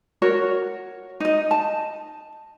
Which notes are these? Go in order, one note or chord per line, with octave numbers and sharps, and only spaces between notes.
F#4 A#4 C#5
D#4 D#5
A5